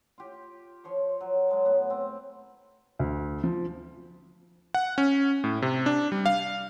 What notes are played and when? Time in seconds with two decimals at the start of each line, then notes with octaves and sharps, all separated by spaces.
0.18 F4 G4
0.84 F3 C#5 C6
1.21 F#3
1.48 F#3 G#3 A5
1.66 A2 B3
1.90 C4
2.99 D2
3.44 F3
4.74 F#5
4.98 C#4
5.44 A2
5.62 C3
5.86 D4
6.12 G3
6.26 F5